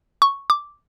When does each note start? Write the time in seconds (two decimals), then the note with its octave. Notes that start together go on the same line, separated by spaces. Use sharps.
0.22 C#6
0.50 D6